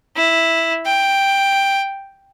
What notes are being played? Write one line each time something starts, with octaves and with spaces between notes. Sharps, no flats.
E4
G5